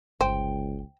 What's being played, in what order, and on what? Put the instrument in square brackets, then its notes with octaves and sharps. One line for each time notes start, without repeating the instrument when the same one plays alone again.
[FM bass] G1 [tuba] C#2 [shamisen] C5 [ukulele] G5